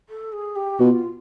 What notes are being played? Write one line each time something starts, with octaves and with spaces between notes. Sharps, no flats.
A4
G#4
G4
B2 F4 F#4